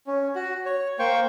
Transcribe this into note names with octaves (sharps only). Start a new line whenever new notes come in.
C#4
F#4
C#5
A#3 C5 G5 C#6